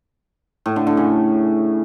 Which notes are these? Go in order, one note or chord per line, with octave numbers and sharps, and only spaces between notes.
A2
D3
D3
C#3